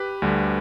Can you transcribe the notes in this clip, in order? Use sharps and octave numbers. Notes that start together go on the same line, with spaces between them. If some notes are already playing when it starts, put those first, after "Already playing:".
Already playing: G4 B4
D2 D3 G3